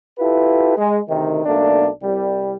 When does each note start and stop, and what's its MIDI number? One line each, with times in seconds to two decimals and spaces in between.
0.19 0.76 64
0.19 0.76 65
0.19 0.76 67
0.19 0.76 69
0.19 0.76 71
0.77 0.98 56
1.08 1.41 38
1.08 1.41 48
1.08 1.41 51
1.44 1.88 35
1.44 1.88 57
1.44 1.88 58
1.44 1.88 62
2.02 2.54 36
2.02 2.54 55